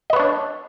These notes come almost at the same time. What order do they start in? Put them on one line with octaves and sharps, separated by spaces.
D#5 B4 C#5 D4